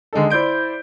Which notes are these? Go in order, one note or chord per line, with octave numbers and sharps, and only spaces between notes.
D3 G#3 D#4 A4
E4 C5 D5 G6 D7